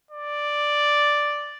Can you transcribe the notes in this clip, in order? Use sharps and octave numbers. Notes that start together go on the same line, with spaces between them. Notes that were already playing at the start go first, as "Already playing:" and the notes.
D5